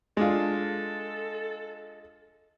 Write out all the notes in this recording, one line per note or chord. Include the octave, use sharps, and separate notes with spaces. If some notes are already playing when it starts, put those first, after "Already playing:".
G#3 D4 F4 A4